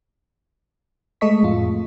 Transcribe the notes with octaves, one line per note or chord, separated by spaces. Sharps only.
G#3 A3 A4 D#5 C#6 B6
F2 A2 F4